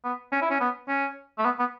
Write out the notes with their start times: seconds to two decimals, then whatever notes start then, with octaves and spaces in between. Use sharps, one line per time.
0.04 B3
0.32 C#4
0.42 E4
0.51 C#4
0.61 B3
0.89 C#4
1.38 A3
1.45 B3
1.59 B3